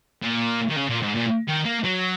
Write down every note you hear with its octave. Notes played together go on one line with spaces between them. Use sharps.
A#2
D#3
C#3
A#2
G#2
A#2
D#3
A#3
F#3